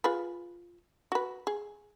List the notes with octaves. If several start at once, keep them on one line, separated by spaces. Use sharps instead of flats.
F4 G#4 B4
F#4 B4
G#4